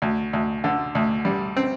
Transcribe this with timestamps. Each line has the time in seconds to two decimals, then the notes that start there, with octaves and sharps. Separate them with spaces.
0.02 D2
0.33 D2
0.64 D3
0.95 D2
1.25 G3
1.57 C4